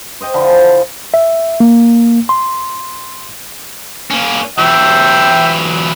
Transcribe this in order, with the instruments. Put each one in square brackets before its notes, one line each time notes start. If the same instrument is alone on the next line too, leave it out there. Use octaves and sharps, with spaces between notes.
[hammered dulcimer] C5 D#5 G5
D3 F3 E4
A4 G#5
[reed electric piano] E5
A#3
C6
[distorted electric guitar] A#3 C#4
[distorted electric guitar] E3 F#3 [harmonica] E5 G5